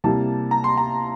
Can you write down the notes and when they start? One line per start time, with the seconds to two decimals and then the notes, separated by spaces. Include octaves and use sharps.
0.04 C3 G3 A#3 E4 A5
0.51 A#5
0.64 C6
0.77 A#5